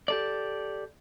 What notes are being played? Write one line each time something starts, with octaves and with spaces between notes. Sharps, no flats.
G4 A4 D5